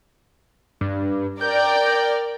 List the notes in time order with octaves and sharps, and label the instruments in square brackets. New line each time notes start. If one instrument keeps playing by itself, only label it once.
[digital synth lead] G2
[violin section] A#4 D5 G5 [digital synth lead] G6